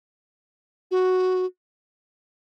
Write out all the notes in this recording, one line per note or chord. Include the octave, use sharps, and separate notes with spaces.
F#4